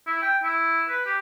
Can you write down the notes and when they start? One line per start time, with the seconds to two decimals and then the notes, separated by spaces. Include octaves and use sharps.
0.07 E4
0.22 G5
0.43 E4
0.88 B4
1.06 G4